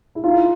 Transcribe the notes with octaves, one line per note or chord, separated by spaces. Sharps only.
E4
D#4 F4